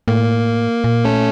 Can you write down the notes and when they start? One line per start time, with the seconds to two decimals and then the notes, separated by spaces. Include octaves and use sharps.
0.08 A2 A#3
0.84 A#2
1.05 A3 C#4 A4